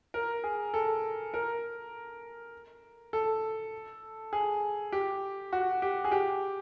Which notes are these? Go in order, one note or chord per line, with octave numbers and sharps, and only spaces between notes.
A#4
G#4
A4
A#4
A4
G#4
G4
F#4
G4
G#4
G4